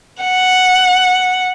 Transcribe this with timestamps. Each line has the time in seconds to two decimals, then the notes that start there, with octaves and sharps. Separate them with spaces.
0.22 F#5